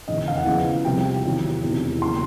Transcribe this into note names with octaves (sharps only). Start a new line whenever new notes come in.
E1 D#2 C#3 E3 D#5
F5
F#5
E2 C#3 F3 G#3 B3
C2 C3 F3 G5
E2 C3 D#3 F#3
E1 E2 C3
C#3 F#3 A#3 C6